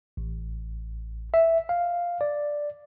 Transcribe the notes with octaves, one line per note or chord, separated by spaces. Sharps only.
A1
E5
F5
D5